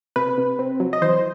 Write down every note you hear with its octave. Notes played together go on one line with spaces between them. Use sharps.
C3 B4
C3
C4
F#3
D#5
E3 C5